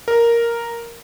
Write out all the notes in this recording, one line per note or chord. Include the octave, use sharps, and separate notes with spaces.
A#4